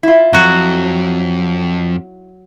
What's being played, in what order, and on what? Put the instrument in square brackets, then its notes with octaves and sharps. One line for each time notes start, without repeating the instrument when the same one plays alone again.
[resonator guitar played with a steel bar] E4 F4
[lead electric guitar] F2 [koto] F#3 F#4